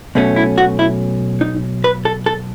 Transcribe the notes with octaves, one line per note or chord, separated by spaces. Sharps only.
B1 B2 A3 C#4
E4
F#4
E4
D#4
B4
A4
A4